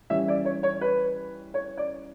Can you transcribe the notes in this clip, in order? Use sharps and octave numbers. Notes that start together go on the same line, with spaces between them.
E3 G3 C#4 E5
D5
C#5
C#5
B4
C#5
D5